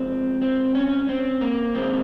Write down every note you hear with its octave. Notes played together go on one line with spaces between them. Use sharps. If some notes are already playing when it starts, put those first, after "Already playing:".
Already playing: F2 C3 F3 G#3 C4
C4
C#4
C4
A#3
F#2 D#3 G#3 C4